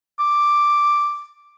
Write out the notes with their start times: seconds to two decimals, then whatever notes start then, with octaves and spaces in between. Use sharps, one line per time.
0.19 D6